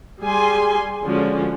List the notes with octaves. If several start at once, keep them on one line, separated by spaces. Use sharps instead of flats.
G3 G#4 G#5 C6
D3 F3 G#3 C#4 F#4